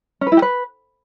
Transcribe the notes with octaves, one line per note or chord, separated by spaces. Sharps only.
C#4
B4
E4
G4
B4